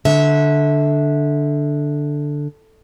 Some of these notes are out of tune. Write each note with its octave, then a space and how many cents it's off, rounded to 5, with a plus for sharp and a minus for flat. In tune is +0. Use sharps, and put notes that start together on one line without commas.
D3 +0 E5 -20